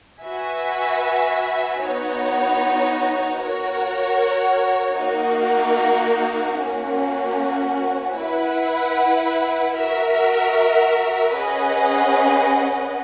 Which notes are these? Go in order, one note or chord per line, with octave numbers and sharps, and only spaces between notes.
F#4 B4 E5 G#5
B3 D#4 F#4 C#5
F#4 A#4 C#5
A#3 D#4 F#4 A#4
A#3 C#4 F#4
E4 B4 F#5
F#4 A#4 E5
C#4 G#4 B4 D#5 F#5